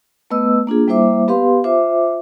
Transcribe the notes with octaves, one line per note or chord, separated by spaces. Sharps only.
A3 B3 B4 D#5 E6
A#3 D4 F4 G#4
G3 A#3 E4 C5 E5 D6
B3 G4 B4 F5 C6
F4 C5 E5 D6